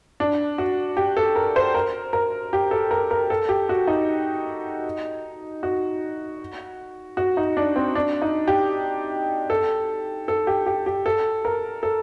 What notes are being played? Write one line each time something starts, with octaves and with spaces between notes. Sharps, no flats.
D4
F#4
G4
A4
A#4
C5
A#4
A#4
G4
A4
A#4
A#4
A4
G4
F#4
D#4
F#4
F#4
D#4
D4
C4
D4
D#4
G4
A4
A4
G4
G4
G4
A4
A#4
A4